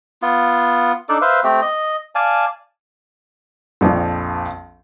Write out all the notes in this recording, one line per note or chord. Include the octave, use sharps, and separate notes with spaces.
B3 F4
D4 D#4 A4 D5
B4 C5 E5 F5
A3 C4 G4
D#5
D5 F5 G#5 A5
A#1 F2 F3 C4